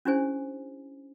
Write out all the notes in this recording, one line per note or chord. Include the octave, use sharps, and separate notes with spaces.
C#4 D4 E4 G4 C5 G#5